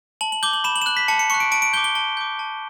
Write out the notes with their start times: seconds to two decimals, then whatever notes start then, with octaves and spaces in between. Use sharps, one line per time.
0.21 A5 F#7
0.32 F#7
0.43 D6 G6 G7
0.53 F#7
0.64 B5 E7
0.76 F#7
0.82 E7
0.86 F#6 F#7
0.97 B6
1.08 A5 C#7
1.19 C#7
1.30 C#6 F#6 C#7
1.40 D7
1.52 A5 D7
1.62 D7
1.73 G6 G7
1.77 D6
1.84 G7
1.95 A5 G7
2.17 D6 G6
2.39 A5